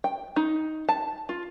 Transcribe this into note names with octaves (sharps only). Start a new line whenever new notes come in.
G5
D#4
A5
F4